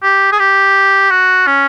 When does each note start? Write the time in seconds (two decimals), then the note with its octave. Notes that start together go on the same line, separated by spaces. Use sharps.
0.03 G4
0.32 G#4
0.39 G4
1.11 F#4
1.47 C#4